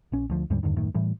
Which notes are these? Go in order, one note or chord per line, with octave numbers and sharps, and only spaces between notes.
A#1 C#4
D2 F3
D#2 G#2 D3 G3
E2 G2 D3 D#3
D#1 F#2 A2 D#3
A2 E3 G3